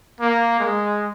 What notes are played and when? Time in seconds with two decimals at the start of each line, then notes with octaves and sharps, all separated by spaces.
0.21 A#3
0.59 G#3